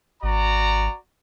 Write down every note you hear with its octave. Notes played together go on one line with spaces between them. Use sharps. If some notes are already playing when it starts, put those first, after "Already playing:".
G#1 F#4 D5 A#5